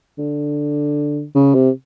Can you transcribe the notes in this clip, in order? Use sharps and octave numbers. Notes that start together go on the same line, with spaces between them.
D3
C#3
C3